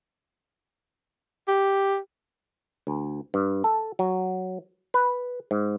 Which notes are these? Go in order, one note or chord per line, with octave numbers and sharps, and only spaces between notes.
G4
D2
G2
A4
F#3
B4
G#2